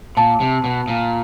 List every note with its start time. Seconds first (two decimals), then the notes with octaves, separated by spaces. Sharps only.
0.17 A#2 A5
0.40 C3
0.64 B2
0.88 A#2